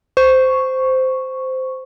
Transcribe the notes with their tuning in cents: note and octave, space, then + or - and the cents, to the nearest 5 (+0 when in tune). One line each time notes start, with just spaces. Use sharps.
C5 -10 C#6 +0